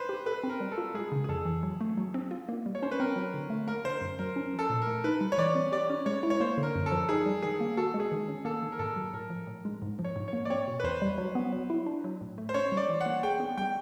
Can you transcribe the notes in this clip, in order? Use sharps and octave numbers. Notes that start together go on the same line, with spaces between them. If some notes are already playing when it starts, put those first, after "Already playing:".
Already playing: B4 C5
G4
A4 B4
C4
A#4
G3
A4
F4
G#3 G#4
C#3
G#4
F2 A4
E3
F#3
A3
F#3
C4
F4
A#3
G3
C#5
C#4 C5
B4
C4 A#4
F#3
D3
A3
A#3 A#4
D3 C5
F#2
F#3 A#4
C#4
F3
A4
A#2
A#4
A3
D#4 B4
G3
C#5
E3 D5
C4
G4 D5
C#4
G#3 C#5
E4
C#5
A#3 C5
D3
A#4
F#2
A4
F3
D#4 G#4
G3
D#3 G#4
A#3
F#4 A4
G#3
G#4
D#3
C#4
A#3 A4
D#3
A#4
G#2 A4
F#3
A2 A#4
F3
A2
G#3
G#2
F3
C#5
G#2
C#5
A#3
D5
C4 C#5
B2
B4
E2 C5
G3
F#3
B3
F#3
E4
D4
F#3
A2
A3
C5
C#4 C#5
G3
D5
E3
F#5
A#3
G#4 G5
B3
G3 G5